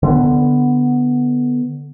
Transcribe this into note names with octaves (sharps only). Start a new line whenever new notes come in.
D3 B3